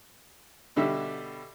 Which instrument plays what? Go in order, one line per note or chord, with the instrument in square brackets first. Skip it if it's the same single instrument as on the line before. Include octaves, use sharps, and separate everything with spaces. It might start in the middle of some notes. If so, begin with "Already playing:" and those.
[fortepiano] B2 D3 G3 E5